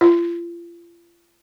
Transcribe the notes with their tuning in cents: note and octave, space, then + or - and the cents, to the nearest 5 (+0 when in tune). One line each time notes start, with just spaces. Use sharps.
F4 -35